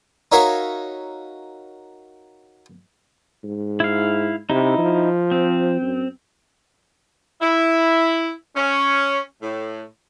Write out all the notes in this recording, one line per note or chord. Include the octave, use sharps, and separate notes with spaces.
D#4 F#4 A#4 C#5 E5 F5
G#2
E4 F5
C3 D#4 E4
F3
C4
F#2
E4
C#4
A2